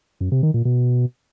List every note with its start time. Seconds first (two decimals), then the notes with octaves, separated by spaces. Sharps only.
0.21 F#2
0.32 C3
0.43 D#3
0.54 A#2
0.65 B2